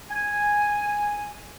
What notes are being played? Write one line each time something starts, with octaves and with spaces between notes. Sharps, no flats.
G#5